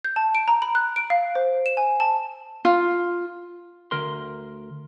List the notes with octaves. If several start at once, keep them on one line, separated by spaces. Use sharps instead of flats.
G6
A5
D7
A#5
B5
F#6
D7
F5
C5
E7
G#5
A5
F4
D2 A#4 C6